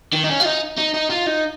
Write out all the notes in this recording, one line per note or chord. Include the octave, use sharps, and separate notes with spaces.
D#3
D#4
C#4
F4
D#4
D#4
D#4
F4
D#4